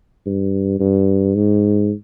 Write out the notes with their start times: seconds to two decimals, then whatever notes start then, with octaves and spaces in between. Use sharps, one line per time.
0.26 G2
0.79 G2
1.35 G#2